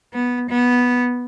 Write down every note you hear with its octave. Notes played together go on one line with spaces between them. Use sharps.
B3
B3